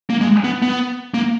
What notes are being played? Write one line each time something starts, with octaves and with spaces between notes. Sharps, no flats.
A#3
G#3
B3
B3
A#3